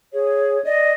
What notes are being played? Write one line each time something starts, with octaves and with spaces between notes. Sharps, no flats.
G#4 C#5
D5 D#5